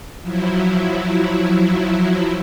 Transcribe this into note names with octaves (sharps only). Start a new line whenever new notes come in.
F3 F#3 E4